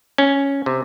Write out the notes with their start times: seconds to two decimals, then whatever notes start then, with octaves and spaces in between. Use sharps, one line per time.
0.18 C#4
0.66 C3